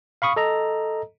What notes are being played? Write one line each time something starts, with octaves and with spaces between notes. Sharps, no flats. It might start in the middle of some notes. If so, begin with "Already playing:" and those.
F5 B5 C#6 D#6
A4 D#5 A#5